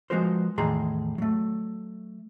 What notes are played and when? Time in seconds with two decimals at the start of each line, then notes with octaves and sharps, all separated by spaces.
0.10 F3 G#3 B3 F#4 A#4 C5
0.58 E2 A2 D#3 G#4 A#5 C6
1.18 F#3 A3